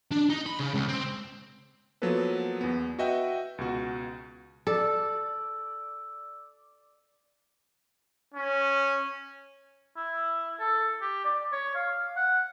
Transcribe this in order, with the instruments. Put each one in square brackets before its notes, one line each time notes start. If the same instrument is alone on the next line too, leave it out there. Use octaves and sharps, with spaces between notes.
[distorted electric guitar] D4
D#4
B5
C#3
C#2
C4
[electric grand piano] F3 F#3 A#3 B3 A4 B4
E2 B3
F#4 B4 D#5 E5 F#5 G5
C#2 B2 F#4
[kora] A4 [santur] D5 [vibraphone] E6
[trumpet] C#4
[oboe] E4
A4
G4
D5
C#5
F5
F#5